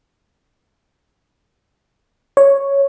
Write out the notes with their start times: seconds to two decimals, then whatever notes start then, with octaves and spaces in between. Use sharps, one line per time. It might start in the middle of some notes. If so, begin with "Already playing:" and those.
2.37 C#5